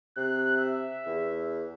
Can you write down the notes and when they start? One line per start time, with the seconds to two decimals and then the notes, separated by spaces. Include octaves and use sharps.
0.17 C3 F#6
0.57 E5
1.06 E2